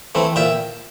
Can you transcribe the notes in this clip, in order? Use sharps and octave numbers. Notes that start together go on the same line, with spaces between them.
E3 A3 C4
A#2 E5 G5